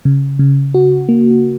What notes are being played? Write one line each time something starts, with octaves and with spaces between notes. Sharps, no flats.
C#3
C#3
F#4
A#3